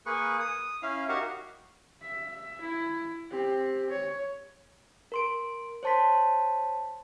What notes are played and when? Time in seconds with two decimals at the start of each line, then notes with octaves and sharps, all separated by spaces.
0.06 A#3 G#4 B4 C#6
0.40 D#6
0.82 C#4 E4 F5
1.09 D#4 F#4 G4 A#4 F5 F#5
2.01 E5
2.62 E4
3.30 C4 G4
3.90 C#5
5.12 A#4 C6 D7
5.83 C5 C#5 A5 C6 B6